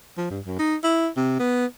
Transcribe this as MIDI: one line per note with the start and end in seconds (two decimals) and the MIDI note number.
0.18 0.28 53
0.30 0.40 43
0.45 0.59 42
0.59 0.75 63
0.83 1.07 64
1.17 1.38 48
1.39 1.65 59